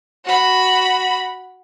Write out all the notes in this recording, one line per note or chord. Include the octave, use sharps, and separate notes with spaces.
F#4 B5